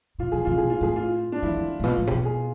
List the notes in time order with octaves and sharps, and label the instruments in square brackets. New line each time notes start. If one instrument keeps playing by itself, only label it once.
[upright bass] B2 [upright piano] F4
[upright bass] B2 [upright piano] G#4
[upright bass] C3 [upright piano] F4
[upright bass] B2 [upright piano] G#4
[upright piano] F4
[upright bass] A2 [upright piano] G#4
[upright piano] F4
D4
[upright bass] E3 [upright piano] E4
[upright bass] D3
A2
[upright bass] B2 [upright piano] F4
[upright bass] A2
C3
B2
[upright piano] G#4